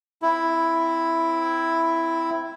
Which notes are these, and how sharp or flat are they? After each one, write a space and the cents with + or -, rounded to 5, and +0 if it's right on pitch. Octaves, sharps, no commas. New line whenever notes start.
C4 -20 E4 +0